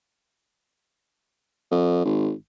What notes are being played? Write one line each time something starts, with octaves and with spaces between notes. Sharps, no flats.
F2
G#1